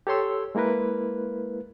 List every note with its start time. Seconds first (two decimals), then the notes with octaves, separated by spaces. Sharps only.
0.07 G4 A4 C#5 C6 E6
0.55 G#3 A#3 E4 A#4 B4